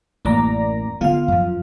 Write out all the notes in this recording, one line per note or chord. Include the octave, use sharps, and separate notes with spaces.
A1 F#2 A#3 D5 A#5
D3 B3 F4 F5
F#2 F3